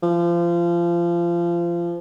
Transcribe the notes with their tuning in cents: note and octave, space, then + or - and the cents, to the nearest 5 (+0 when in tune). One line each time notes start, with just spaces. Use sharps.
F3 -25